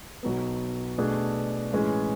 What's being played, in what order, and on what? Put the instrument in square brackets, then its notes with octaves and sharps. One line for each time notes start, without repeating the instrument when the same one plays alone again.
[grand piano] B1 B2 F#3 B3
B2 A3 D4 G#4
A2 E3 G#3 C#4 G#4